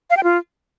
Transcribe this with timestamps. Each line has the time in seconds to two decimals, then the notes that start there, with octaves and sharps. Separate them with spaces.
0.10 F5
0.17 G5
0.24 F4